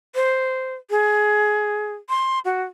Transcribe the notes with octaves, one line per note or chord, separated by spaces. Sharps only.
C5
G#4
C6
F#4